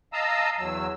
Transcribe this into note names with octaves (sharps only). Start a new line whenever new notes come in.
D#5 F5 A5 A#5 D#6 E6
E2 F#3 E6